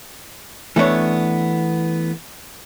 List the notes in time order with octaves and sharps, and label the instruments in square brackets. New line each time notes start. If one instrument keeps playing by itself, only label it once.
[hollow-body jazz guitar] E3 A3 B3 D4 C#5